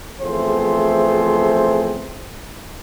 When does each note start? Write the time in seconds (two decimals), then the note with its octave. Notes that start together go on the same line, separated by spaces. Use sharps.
0.22 E2 F3 A3 C4 G#4 C5